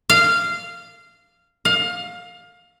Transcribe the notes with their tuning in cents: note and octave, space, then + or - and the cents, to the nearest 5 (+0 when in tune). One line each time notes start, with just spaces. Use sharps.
F5 -15
F5 +20